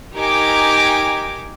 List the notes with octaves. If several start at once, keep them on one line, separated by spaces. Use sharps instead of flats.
D#4 G4 A#4 G#5 D6